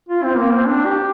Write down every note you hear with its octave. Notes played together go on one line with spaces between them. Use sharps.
F4
C4
A#3
C4
D4
G4